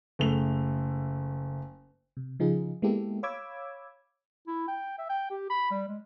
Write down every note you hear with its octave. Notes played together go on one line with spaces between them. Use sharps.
F#1 A3 F7
C3
C#3 F3 D#4 F4 G#4
G#3 A#3 B3 E4 G4 A4
C#5 F5 B5 D6 E6 G#6
E4
G5
E5
G5
G4
B5
G3
G#3